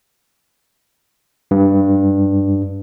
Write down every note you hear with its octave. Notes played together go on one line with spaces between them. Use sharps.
G2